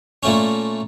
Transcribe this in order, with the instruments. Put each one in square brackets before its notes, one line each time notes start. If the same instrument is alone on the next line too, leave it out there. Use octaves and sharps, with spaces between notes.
[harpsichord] A#2 A3 C#4